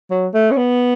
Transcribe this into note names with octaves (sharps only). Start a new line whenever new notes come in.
F#3
A3
C#4
B3